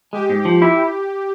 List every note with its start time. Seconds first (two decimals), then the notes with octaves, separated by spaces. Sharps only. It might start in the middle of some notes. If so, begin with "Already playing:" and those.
0.13 G#3 G4
0.30 G#2
0.45 F3
0.62 E4